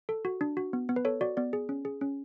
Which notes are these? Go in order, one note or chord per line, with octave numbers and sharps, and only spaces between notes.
A4
F#4
D4
F#4
B3
B3
B4
A4 C#5
F#4 D5
B3 D5
G#4
C#4
G#4
C#4